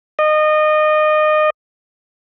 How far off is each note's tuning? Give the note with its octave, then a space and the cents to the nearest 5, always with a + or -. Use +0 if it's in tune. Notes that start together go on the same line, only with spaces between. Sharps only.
D#5 -25